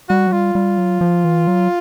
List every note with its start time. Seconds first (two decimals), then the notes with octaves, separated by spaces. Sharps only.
0.09 G3 F#4
0.27 F#3
0.32 G3 F4
0.55 G3
0.78 F#3
1.01 F3
1.24 E3
1.47 F#3